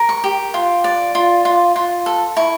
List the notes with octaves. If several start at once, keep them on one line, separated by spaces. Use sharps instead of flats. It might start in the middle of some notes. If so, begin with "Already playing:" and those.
Already playing: A#4
C#6
G4
F4
D5
F4
F4
F4
A4
E4 C#6